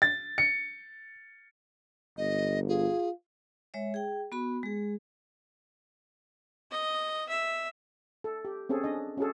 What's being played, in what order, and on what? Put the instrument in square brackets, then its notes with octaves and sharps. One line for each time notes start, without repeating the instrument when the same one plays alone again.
[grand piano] A6
C#7
[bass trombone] G1 [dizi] D#5
[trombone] F4 [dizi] G#4
[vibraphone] G#3 C#5 E5
G#4 G5
B3 F#4 B5
G#3 G#4
[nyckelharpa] D#5
E5
[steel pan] A4
G4
C4 C#4 G#4 A4
D4 D#5
C#4 F#4 G#4 A4